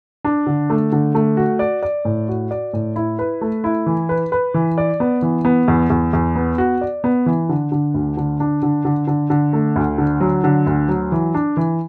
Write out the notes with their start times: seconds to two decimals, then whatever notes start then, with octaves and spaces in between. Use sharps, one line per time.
0.25 D4
0.47 D3
0.70 A3
0.92 D3
1.15 A3
1.37 F#4
1.59 D5
1.83 D5
2.05 A2
2.29 F#4
2.51 D5
2.73 A2
2.96 E4
3.19 B4
3.41 A3
3.64 E4
3.86 E3
4.09 B4
4.32 B4
4.54 E3
4.78 D5
5.00 B3
5.22 E3
5.45 B3
5.68 E2
5.90 E2
6.13 E2
6.36 B3
6.58 F#4
6.81 D5
7.04 B3
7.26 E3
7.49 D3
7.72 D3
7.94 D2
8.17 D3
8.40 D4
8.63 D3
8.85 D3
9.07 D3
9.30 D3
9.53 A3
9.76 D2
9.98 D3
10.21 F#3
10.44 D3
10.66 D2
10.89 F#3
11.12 E3
11.34 D4
11.57 E3